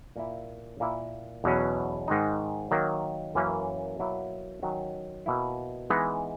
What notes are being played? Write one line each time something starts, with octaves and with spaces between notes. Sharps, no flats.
A#2 A#3 E4
A#2 A#3 E4
E2 B2 F#3 C#4
G#2 D#3 G#3 D#4
D#3 F#3 A#3
F#2 E3 A#3 C#4
B2 F#3 A#3 E4
D#3 F#3 C#4
B2 A#3 E4
E3 G#3 B3 D#4